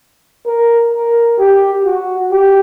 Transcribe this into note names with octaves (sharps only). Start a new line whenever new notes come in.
A#4
A#4
G4
F#4
G4